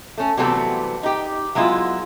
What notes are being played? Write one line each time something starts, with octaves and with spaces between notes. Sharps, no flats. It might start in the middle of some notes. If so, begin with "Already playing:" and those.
A3 C#4
C3 E3 F#3 G3 A3 B3
D#4 G4
F#3 G#3 B3 E4 F4